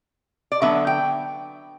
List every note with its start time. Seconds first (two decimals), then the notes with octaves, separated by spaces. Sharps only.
0.52 D5
0.62 D3 F#3 B3 E5
0.87 G5